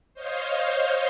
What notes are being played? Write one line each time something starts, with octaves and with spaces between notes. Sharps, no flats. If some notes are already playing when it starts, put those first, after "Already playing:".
C5 C#5 D#5 F5 G6